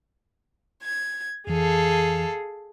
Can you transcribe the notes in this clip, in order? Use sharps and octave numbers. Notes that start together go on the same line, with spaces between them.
G#6
F2 E3 G#4 A4 F5